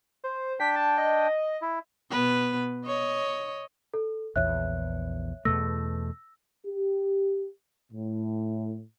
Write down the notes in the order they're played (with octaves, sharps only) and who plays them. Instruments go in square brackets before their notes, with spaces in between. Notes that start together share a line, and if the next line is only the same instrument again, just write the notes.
[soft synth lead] C5
[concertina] D4 G5 [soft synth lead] B6
[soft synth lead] A5
D#5
[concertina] E4
[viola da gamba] B2 B3 B4
C#5 D#5
[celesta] A4
[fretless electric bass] A#1 E2 [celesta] C#5 E5 F#6
[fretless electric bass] E2 B2 A3 [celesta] E6 A#6
[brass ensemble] G4
A2